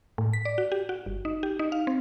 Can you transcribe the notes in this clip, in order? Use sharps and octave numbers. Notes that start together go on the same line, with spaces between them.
A2
B6
D5
F#4
G4
F#4
G1
D#4
G4
D#4
F5
C4